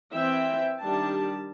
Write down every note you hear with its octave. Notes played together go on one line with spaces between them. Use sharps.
E3 C4 E5 G5
D#3 G3 D4 A5